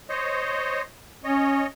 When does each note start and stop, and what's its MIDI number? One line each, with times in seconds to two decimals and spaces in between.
0.09 0.82 72
0.09 0.82 73
0.09 0.82 75
1.24 1.64 61
1.24 1.66 73
1.24 1.66 75